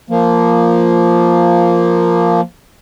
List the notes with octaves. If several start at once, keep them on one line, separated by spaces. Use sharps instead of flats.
F3 A#3